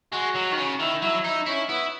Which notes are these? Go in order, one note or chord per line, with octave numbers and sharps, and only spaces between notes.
G#3 F#4
F#3
D#3
C#3
D#3 E4
F#3 E4
D#4 E4
C#4 E4
B3 E4